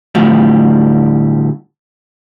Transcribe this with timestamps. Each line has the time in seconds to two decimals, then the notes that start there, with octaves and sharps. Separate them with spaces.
0.15 D2 A2 F3 G3